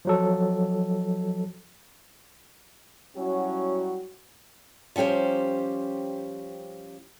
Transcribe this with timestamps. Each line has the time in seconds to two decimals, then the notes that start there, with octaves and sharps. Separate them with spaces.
0.05 F3 F#3 A4
3.16 F#3 G3 C#4 E4 F#4
4.96 F3 G3 C#4 G4 C5